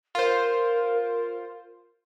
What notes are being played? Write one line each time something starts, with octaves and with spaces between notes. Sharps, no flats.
F4 A#4 C5